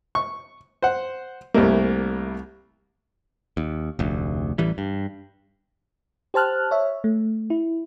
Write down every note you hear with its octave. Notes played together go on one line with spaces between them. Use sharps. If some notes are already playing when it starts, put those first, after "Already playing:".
C#6
C5 F#5
C2 G3 A3 A#3
D#2
F1 D2
A1 E3 G3
G2
G4 C5 A5 F6 F#6
C#5 E5
A3
E4